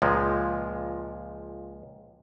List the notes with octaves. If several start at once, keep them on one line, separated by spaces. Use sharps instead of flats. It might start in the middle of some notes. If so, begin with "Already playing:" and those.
C#2 A#2 F3 G#3